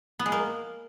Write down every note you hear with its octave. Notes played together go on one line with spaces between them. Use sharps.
B3
G#3
A#3